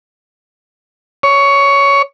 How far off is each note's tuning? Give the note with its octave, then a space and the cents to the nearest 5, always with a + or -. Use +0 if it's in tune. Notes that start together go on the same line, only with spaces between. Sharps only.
C#5 +15